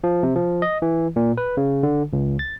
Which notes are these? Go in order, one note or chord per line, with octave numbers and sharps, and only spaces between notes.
F3
C3
F3
D#5
E3
A#2
B4
C#3
D3
C#2
A6